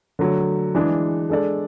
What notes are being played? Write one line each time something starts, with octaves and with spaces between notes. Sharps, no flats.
D3 F#3 A3
E3 G#3 D4 G#4
G#3 D4 A4 D5